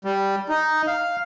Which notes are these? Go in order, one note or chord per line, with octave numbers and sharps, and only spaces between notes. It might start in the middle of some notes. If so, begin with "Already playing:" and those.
G3
D#4
F5